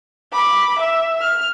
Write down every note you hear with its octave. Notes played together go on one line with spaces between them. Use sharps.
B5 D6
E5
F6